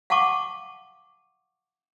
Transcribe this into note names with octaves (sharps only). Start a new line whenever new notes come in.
F5 F#5 A5 C#6 D6